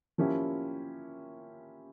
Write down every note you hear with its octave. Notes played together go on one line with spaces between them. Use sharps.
F3 A#3 C#4 E4 G4